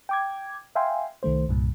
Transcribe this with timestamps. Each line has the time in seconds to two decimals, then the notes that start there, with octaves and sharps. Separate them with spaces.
0.09 G5 D6 G#6
0.75 E5 F5 G5 G#5 C6
1.23 C2 D#3 A3 C5
1.49 C2 G2 A#2